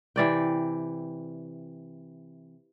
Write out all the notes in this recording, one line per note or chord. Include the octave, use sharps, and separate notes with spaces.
C3 E3 D5 G5